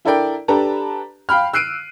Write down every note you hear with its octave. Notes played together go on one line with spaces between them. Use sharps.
D4 E4 A4 A#4 D5 G5
D4 G4 A4 B4 A5 A#5
F5 G5 B5 F6
E6 F#6 C7 D7 D#7